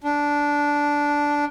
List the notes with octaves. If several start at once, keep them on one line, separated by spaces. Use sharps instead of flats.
D4